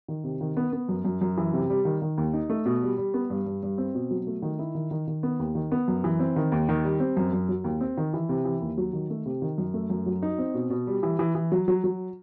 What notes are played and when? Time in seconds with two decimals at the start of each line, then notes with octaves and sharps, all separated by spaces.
0.08 D#3
0.24 C3
0.41 D#3
0.57 B3
0.73 B3
0.89 F#2
1.05 F#2
1.21 F#2
1.37 E3
1.53 C3
1.70 G3
1.85 D#3
2.02 D#3
2.18 D#2
2.33 D#4
2.50 A3
2.66 B2
2.82 G3
2.98 G3
3.14 B3
3.30 G2
3.46 G2
3.63 G2
3.78 C4
3.95 B2
4.11 F#3
4.27 A3
4.42 D#3
4.59 E4
4.75 D#3
4.91 D#3
5.08 D#3
5.23 B3
5.39 D#2
5.55 D#3
5.72 B3
5.88 F#2
6.04 E3
6.19 C4
6.36 D#3
6.52 D#2
6.69 D#3
6.84 G3
7.00 C4
7.17 F#2
7.33 F#2
7.49 F#3
7.64 D#2
7.81 C4
7.98 D#3
8.14 E3
8.29 C3
8.45 E3
8.61 D#2
8.78 F#3
8.93 D#3
9.10 A3
9.26 C3
9.42 D#3
9.58 F#2
9.74 A3
9.90 F#2
10.06 F#3
10.22 D#4
10.38 C4
10.54 B2
10.70 B2
10.87 G3
11.03 E3
11.19 E3
11.35 E3
11.52 F#3
11.68 F#3
11.84 F#3